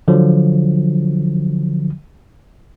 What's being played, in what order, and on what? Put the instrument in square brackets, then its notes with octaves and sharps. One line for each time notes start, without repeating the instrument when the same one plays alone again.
[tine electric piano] D3 F3 F#3